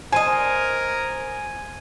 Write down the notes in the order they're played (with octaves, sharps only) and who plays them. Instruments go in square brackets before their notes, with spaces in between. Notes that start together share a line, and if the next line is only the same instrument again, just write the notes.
[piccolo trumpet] A#4 [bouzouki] C5 D#5 [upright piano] G#5 [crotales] G#6 D#7